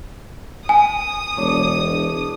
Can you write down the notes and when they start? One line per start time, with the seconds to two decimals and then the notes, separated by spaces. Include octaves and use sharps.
0.69 G#5 D#6
1.37 E1 D4 C#5